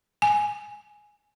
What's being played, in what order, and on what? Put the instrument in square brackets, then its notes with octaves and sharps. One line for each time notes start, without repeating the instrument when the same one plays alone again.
[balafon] G#5